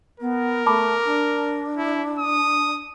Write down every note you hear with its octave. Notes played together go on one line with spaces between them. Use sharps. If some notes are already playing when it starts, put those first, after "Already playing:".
B3 A#4
A3 A5 B5 D6
D4
E4
D#6